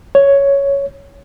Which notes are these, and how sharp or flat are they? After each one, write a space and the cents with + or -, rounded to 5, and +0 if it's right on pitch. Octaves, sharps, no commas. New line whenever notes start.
C#5 +5